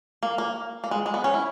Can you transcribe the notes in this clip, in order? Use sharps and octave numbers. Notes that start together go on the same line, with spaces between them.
A#3
A#3
A#3
G#3
G#3
B3
C#4
E4